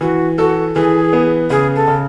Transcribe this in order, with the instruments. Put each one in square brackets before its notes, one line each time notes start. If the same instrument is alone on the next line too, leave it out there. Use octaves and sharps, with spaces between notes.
[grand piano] E3 [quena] F#4
[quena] F#4 [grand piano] A4
[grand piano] E3 [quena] G#4
[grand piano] B3
[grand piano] C#3 [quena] G#4
[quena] A4
[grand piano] C#3